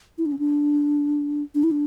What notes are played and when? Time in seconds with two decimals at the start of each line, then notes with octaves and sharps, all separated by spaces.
0.18 E4
0.26 D4
0.32 C#4
0.39 D4
1.55 D4
1.63 E4
1.71 D4